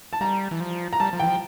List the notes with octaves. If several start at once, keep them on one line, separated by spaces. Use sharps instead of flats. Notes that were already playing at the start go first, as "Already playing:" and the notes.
A5
G3 A#5
E3
F3
A#5
G3 A5
F3
E3 G5
F3